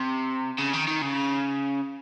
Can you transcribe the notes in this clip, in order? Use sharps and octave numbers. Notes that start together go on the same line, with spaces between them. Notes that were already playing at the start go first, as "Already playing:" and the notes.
Already playing: C3
C#3
D#3
D#3
C#3